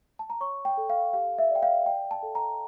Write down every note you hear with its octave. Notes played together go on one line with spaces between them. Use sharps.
A5
A#5
C#5 C#6
G5
A4
F5
G4 F5
E5
D5 G5
F5
D5 G5
A5
A4
A#5